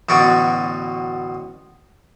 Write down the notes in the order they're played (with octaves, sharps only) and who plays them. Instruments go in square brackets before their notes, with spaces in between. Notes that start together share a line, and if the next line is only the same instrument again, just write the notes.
[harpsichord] A1 B2 D3 F#4 D5 C#6